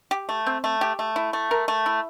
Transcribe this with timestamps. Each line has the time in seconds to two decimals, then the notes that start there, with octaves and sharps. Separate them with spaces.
0.11 G4
0.29 A3
0.46 C4
0.64 A3
0.81 G4
0.99 A3
1.16 E4
1.33 A3
1.51 A#4
1.68 A3
1.86 E4